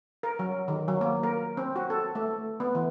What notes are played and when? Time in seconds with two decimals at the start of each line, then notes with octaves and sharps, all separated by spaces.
0.23 A#4
0.39 F#3
0.68 D#3
0.88 F#3
1.01 A#3
1.23 A#4
1.57 C4
1.76 F#4
1.90 A4
2.15 A3
2.60 B3
2.75 E3